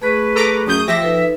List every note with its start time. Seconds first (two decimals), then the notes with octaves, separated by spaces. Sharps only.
0.02 A3 G#4 B4 C#6
0.35 A4 A#5 D6
0.67 F#2 D#6 G6
0.87 F3 F4 G4 C5 E5 A#6
1.02 D#4 A4 B4